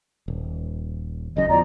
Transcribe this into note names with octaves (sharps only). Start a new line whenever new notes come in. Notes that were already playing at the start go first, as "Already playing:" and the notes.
D#1
F#1 F#2 D#5
E2 F3 D5 A#5